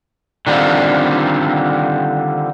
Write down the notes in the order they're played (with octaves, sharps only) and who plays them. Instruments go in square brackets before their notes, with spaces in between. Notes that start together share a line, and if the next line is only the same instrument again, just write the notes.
[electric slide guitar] D3 D#3 G3 C4 F4